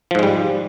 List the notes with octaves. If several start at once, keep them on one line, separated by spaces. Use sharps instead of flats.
G#2 F3 G3 G#3